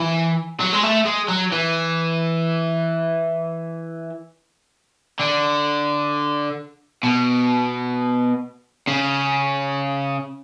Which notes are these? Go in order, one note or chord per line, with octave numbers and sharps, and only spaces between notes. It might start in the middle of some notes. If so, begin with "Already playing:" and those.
Already playing: E3
F#3
G#3
A3
G#3
F#3
E3
D3
B2
C#3